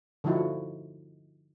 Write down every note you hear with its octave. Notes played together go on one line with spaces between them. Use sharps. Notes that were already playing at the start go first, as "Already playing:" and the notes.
D3 F3 D#4 E4 F#4